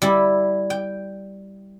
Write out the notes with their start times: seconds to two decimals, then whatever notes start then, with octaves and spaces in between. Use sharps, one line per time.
0.02 G3 E4
0.70 G5